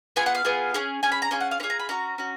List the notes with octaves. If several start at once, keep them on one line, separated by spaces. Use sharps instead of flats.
B3 F4 G#4 G#5
F#5
F5
B3 F4 G#4
C#4 G#4
C#4 G#4 G#5
B5
A#5
C#4 F4 G#4 G#5
F#5
F5
C#4 C#5
F4 G#4
A#5
B5
C#4 F#4 A#5
C#4 F#4